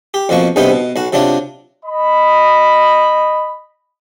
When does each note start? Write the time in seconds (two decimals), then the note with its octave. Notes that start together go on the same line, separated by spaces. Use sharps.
0.14 G4
0.29 F2 B2 F3 A#3 C#6
0.56 B1 G2 C3 B3 D#4 C5
0.72 B2
0.96 B1 F#4
1.13 C3 F#3 D4 F4
1.85 D#5 B5